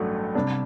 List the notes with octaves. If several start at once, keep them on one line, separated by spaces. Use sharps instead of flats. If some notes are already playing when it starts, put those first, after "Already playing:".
Already playing: A1 G2 F#3 A3
C3 G3 D4